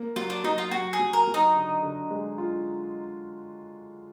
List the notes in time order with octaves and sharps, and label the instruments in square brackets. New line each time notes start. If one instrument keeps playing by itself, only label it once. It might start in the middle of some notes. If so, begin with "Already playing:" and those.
Already playing: [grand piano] A#3
[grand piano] F#3 [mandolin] F4
[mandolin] D4
[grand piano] F#3 [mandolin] D#4
[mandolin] F4
[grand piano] F#3 [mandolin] F#4
[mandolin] G#4
[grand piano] F#3
[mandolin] A#4
[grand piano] F#3
[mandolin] D#4
[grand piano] D3
D3
G#3
F4